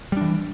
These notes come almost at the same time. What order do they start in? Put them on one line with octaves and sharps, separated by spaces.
G3 D4 E3